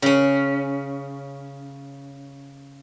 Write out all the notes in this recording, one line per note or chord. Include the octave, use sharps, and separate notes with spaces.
C#3 C#4